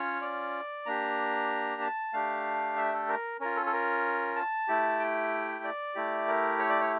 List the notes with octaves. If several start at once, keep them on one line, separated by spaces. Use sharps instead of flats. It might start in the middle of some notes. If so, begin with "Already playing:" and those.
Already playing: C#4 F4 C#5
D5
A#3 D4 G4 A#5
A5
A3 D4 G4 F5
E5
A4
A#4
C#4 F4 A#4
A4
A4
A#4
A5
A3 E4 G4
G5
D5
A3 E4 G4
A#4
C#5
D5
C#5